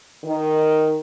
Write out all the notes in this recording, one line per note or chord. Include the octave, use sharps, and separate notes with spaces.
D#3